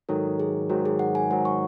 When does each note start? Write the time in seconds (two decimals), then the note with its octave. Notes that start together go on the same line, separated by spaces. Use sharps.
0.09 G#2 D#3 F#3 A4
0.39 G#4
0.69 G#2 D#3 F#3 F#4
0.85 G#4
0.99 F#5
1.15 G#5
1.30 G#2 D#3 F#3 F#5
1.45 C#6